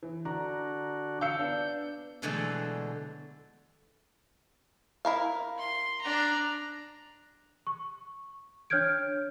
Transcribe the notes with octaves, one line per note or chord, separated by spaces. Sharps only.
E3
D3 D4 F#4 A#5
F5 E6 G6 C#7
B3 D4
B2 D3 E3 F#3 G#3 A3
E4 A#4 F5
C6
D4 A#5
C#6
D4 C#5 F6 G6 G#6 D7